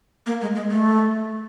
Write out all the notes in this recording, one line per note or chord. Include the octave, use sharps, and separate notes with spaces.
A#3
G#3
G#3
A3